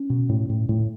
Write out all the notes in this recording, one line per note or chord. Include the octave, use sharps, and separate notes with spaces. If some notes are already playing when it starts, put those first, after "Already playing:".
Already playing: C#4
B2
A2
A2
A2